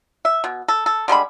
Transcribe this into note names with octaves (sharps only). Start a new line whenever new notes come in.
E5
B2
A4
A4
D3 G3 G#3 B5